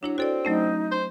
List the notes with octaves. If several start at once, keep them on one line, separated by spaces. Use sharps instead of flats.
F#3 D4 E4 C#5
C4 F#4 A4 D5
F#3 A3 C#4 D#4
C5